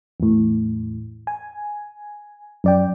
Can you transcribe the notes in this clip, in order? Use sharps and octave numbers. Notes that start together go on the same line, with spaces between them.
E2 A2
G#5
F#2 D5 G5